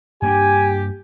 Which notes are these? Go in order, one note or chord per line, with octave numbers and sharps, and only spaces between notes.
G2 A#3 D4 G4 G#5